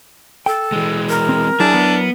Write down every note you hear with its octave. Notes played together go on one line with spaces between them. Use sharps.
A4 G5
E3 G#3
A#4
C4
F#3 D4 E4 G#4
B3